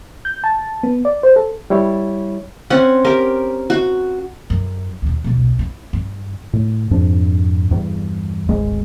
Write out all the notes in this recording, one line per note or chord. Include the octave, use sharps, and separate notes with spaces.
G6
A5
B3
D5
C5
A4
G3 E4 C#5
C4 C#4 F#5
G4 A#4
F#4
F#2
D#2 A#2
D#1 B1
E4
G2
A2
F2 G#2 D4
E2 G2
D1 G#1 G#3